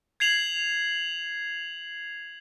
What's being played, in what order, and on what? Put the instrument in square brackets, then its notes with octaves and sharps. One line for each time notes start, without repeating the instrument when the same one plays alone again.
[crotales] G#6 C7 F7 F#7